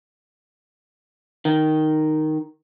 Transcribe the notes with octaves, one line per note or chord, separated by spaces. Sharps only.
D#3